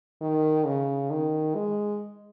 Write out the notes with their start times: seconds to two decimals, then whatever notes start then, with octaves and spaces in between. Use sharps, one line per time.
0.21 D#3
0.66 C#3
1.10 D#3
1.55 G#3